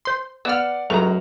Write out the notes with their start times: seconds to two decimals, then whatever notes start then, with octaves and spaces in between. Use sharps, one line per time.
0.05 C5 C6
0.45 B3 D5 F#5 E6 F6
0.90 C#2 F#2 A3 A#5 F7